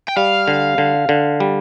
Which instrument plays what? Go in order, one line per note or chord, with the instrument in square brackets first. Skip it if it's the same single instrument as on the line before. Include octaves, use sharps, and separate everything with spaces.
[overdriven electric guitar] G5
[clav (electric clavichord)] G3 [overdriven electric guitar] F5
[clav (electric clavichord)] D3
D3
D3
G3